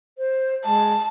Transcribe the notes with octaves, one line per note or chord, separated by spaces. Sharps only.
C5
G#3 A5